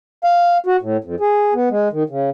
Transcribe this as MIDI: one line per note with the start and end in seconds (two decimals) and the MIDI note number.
0.24 0.58 77
0.66 0.77 66
0.81 0.97 45
1.04 1.15 41
1.20 1.54 68
1.54 1.69 59
1.71 1.88 56
1.92 2.03 51
2.10 2.30 49